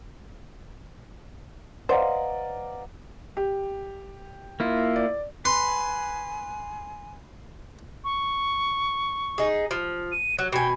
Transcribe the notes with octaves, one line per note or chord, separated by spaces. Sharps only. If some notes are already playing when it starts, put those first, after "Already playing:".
B4 C5 D5 D#5 F5 F#5 A#5
G4
A#3 E4 F4
D5
B4 G#5 C6
C#6
D#4 G#4
F3
D#7
F#3 F#6
B2 G5 G#5